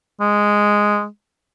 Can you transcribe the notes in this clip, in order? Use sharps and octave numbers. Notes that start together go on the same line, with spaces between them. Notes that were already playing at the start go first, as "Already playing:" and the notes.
G#3